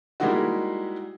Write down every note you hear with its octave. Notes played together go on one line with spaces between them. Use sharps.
G3 G#3 A#3 D#4 E4 F#4